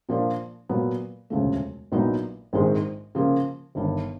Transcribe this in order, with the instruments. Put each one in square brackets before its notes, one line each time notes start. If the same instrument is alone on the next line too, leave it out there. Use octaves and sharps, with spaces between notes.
[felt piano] A#2 F3 A#3 D4
A#2 F#3 B3
E1 D2 C#3 F3 A3
A#1 A#2 F#3 B3 D#4
A#1 G#2 D#3 G#3 C4
C#3 F3 A#3
G1 G2 D#3